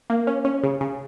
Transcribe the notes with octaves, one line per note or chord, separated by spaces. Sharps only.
A#3
C#4
C#4
C#3
C#3